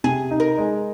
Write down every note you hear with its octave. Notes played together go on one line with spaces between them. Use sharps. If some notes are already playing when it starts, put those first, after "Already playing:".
C3 G#4
D#4
A#4
G#3